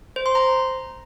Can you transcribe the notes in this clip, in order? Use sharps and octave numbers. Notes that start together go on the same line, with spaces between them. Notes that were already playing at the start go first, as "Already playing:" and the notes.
C5
C6
A#5